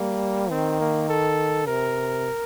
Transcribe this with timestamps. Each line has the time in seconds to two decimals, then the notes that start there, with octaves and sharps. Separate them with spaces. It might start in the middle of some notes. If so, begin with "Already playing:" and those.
Already playing: G3 A#3
0.50 D#3 C4
0.81 A#3
1.09 A4
1.67 C3 A#4